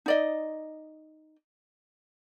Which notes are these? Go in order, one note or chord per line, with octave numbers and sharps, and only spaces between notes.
D#4 D5 D#5